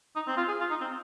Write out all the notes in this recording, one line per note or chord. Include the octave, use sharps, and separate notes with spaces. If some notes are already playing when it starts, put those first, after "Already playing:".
D#4
C4
F4
G#4
F4
D#4
C4